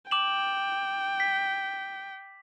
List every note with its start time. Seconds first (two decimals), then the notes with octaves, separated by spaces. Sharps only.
0.11 G5 D6 E7 F#7
1.20 B6